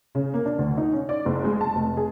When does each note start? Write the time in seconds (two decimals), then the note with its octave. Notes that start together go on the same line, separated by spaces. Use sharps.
0.15 C#3
0.34 A#3
0.45 D4
0.59 D2
0.78 D#4
0.93 C#4
1.09 D5
1.25 F#1
1.44 G#3
1.61 A5
1.75 F1
1.97 G#4